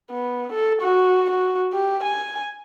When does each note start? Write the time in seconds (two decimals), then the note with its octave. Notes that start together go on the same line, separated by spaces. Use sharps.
0.11 B3
0.53 A4
0.82 F#4
1.31 F#4
1.73 G4
2.04 G#5